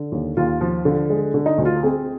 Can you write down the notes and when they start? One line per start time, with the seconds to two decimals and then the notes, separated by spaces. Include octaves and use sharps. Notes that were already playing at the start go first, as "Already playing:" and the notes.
Already playing: D3
0.12 D#2
0.37 D#2 F4
0.61 F3
0.85 D3
1.10 G#3
1.34 D3
1.46 D#4
1.58 D2
1.65 F4
1.83 C4 G#4